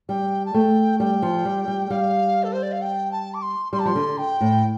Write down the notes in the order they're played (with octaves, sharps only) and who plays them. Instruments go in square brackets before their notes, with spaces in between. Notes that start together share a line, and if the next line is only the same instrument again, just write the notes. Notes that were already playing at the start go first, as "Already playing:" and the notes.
[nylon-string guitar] G3 [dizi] G5
[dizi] A5
[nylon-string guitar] A3 [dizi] G5
[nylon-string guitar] G3 [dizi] G5
[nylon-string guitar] F3
G3
G3
[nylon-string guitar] G3 [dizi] F5
[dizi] A4
C5
D5
F5
G5
A5
D6
C6
[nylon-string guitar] G3 [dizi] C6
[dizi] A5
[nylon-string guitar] F3 [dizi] C6
[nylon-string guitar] D3
[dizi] G5
[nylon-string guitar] A2